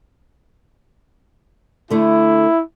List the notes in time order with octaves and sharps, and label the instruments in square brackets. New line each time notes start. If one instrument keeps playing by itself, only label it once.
[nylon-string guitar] D3 A3 [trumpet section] E4